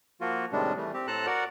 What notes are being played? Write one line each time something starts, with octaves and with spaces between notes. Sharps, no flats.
F3 A#3 F4 F#4
A2 C3 D#3 G3 G#3 D4
E3 G3 A3
C4 G4
A2 A4 C5 A5 A#5 F#6
F#4 A#4 D5 F#5